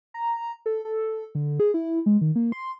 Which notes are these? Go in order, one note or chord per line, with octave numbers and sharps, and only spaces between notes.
A#5
A4
A4
D3
G#4
E4
G#3
D#3
A#3
C6